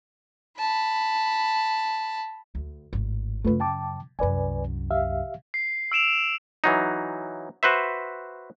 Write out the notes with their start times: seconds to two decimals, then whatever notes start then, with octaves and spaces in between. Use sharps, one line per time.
0.58 A5 B5
2.55 D2
2.93 G#1 A2
3.44 F#2 C#3 A3 F4 B4
3.60 G5 A5 D6
4.19 C2 F#2 B4 D5 G#5
4.91 G4 E5 F5
5.54 C7
5.92 E6 D7 E7 F7
6.64 E3 F#3 D#4
7.63 F#4 B4 C5 E5